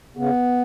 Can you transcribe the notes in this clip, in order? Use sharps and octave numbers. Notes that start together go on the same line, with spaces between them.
C#3 B3